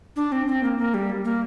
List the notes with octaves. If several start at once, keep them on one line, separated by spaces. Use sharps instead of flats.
D4
C4
C4
A#3
A#3
G3
A#3